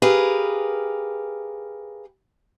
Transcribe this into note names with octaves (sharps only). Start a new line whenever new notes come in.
G4 G#4 A#4 B4 F5